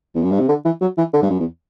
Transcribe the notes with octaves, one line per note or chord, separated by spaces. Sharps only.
E2
F#2
G2
C3
D3
E3
F#3
E3
D3
G2
F#2
E2